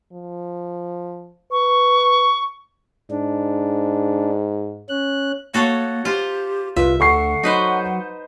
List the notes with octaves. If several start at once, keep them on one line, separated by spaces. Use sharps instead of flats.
F3
B4 C#6
G#2 D4
C#4 F#6
A#3 F#4 A4 C#5
F4 G4 C5
C2 F4 B4 E5
D2 A4 F#5 C#6 C7
F#3 D#4 B4 C5